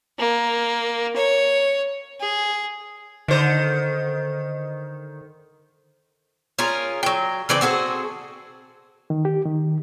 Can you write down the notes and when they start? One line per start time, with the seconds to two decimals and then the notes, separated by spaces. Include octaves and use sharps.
0.19 A#3
1.16 C#5
2.20 G#4
3.28 D3 D#3 C5
6.59 C#4 F4 G#4 A#4
7.03 F#3 G5
7.49 C#3 E3 C4 D5
7.61 C4 F#4 G#4 A4
9.10 D#3
9.25 G4
9.46 D#3